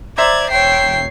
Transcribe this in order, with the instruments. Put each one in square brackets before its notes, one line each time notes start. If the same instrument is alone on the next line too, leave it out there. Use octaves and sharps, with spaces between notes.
[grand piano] C5 E5 A#5 [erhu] D5 [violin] G#6
[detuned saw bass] E1 [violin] C#5 C7 [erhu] G5